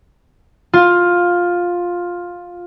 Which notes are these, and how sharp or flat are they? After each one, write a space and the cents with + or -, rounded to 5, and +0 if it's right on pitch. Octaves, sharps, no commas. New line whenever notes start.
F4 +10